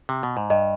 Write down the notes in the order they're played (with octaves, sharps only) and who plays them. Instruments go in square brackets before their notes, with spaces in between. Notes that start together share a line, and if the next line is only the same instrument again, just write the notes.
[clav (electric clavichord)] C3
B2
G#2
[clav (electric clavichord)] G2 [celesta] D#5